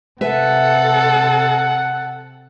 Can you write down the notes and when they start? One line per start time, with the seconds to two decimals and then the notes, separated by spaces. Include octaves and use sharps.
0.21 C3 A4 B4 E5 F#5